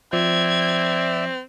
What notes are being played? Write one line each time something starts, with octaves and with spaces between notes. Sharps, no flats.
F3 C4 D5 E5 G#6